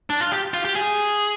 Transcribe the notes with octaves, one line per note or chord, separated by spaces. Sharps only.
D4
F4
G4
F4
G4
G#4